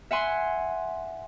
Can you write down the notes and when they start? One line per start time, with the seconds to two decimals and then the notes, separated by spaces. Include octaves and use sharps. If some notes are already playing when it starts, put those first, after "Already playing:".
0.11 E5 F#5 G#5 C6